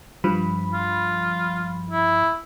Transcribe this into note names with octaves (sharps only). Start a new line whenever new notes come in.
G2 F3 B5
F4
E4